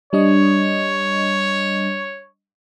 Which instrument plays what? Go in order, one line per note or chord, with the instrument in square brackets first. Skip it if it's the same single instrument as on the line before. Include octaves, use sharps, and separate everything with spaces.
[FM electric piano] G3 D4 D#5 [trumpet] C#5